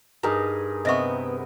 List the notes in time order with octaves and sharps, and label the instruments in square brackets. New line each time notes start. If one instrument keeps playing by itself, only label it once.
[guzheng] G2 [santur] D#4 G#4 A#4
[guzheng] C3 B3 [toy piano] D#5 E5 C#6